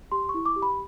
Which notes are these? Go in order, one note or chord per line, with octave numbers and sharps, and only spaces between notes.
G4 C6
C#6
E4
D6
G4
B5